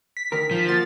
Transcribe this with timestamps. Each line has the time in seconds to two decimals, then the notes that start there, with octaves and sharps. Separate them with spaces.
0.17 B6
0.32 D2 D#3 A#4
0.51 F3
0.68 A#3 F4 F#4 A6